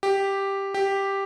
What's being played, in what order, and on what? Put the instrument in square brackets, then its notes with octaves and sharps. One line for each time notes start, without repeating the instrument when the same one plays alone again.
[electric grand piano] G4
G4